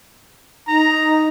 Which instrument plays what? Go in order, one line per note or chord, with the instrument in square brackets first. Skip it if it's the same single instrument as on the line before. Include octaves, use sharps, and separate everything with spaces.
[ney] D#4 [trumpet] A#5